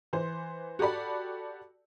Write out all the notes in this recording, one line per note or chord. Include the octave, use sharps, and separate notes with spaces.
E3 C5
F#4 G4 A4 D5 B5